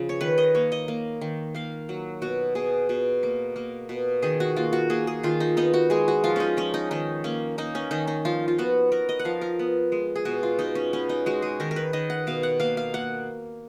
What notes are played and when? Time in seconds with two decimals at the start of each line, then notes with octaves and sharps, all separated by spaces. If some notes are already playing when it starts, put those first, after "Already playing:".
Already playing: C#3 F3
0.09 C#5
0.21 D#3 B4
0.38 D#5
0.55 A#3 C#5
0.72 D#5
0.88 A#3
1.21 D#3
1.55 A#3 F5
1.89 F#3
2.22 B2 F#4
2.55 B2 G#4
2.89 B2
3.23 A#3
3.56 A#3
3.89 B2
4.22 D#3 G#4
4.40 F#4
4.56 A#3 F4
4.73 F#4
4.90 A#3 G#4
5.07 G#4
5.23 D#3 F4
5.40 D#4
5.57 B3 D#4
5.74 F#4
5.90 G#3 G#4
6.08 F#4
6.24 F3 F4
6.36 C#4 D#4
6.57 F3 C#4
6.74 D#4
6.91 D#3 D#4
7.24 A#3 C#4
7.58 A#3 D#4
7.75 C#4
7.91 D#3 D#4
8.08 D#4
8.25 F3 F4
8.48 F4
8.59 B3 F#4
8.92 B3 A#4
9.09 D#5
9.19 F#5
9.25 F3 F5
9.41 A#4
9.59 B3
9.92 G#3
10.16 G#4
10.25 B2 F#4
10.43 F4
10.59 B2 D#4
10.75 C#4
10.93 B3 C#4
11.09 D#4
11.26 G#3 F#4
11.42 G#4
11.60 D#3 A#4
11.71 A#4
11.76 B4
11.93 D#3 D#5
12.10 F#5
12.27 B2 F5
12.43 F#5
12.60 A#3 F5
12.77 F5
12.94 A#3 F#5